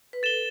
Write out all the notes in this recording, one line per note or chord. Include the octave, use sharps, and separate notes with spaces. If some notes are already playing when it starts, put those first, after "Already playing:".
B4
A4 A6 E7 G7